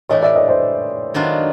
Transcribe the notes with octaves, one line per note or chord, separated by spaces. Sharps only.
A2 E3 A3 D4 G4 C#5 D#5
D5 E5
C#5 D#5
C5 D5
D#3 F#3 B3 D4 F4